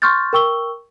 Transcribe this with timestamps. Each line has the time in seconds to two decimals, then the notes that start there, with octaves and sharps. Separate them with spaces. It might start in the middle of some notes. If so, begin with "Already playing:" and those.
0.02 C6 C#6 F6 G6 A6
0.33 A#4 G5 C#6 E6 G7